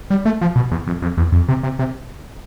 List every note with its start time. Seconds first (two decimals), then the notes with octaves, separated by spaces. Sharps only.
0.10 G3
0.25 A3
0.41 F3
0.56 B2
0.71 E2
0.87 F2
1.02 F2
1.17 E2
1.32 F2
1.49 C3
1.63 C3
1.79 C3